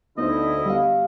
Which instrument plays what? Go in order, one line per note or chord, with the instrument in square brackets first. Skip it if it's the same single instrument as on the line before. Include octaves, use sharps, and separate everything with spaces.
[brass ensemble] D2 D3 E4 [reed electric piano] B3 D#4 C5 [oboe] D#5
[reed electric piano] G3 B3 [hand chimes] G4 F5